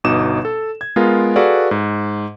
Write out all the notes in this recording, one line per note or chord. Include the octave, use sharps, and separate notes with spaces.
G1 B2 D#4 D6 D#6 E7
A4
G#6
G#3 B3 F4 A#4
F#4 G#4 A4 B4 D5 F5
G#2